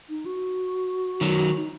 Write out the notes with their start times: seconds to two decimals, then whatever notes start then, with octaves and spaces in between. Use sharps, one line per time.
0.09 D#4
0.26 F#4
1.21 D#3 F#3
1.58 D#4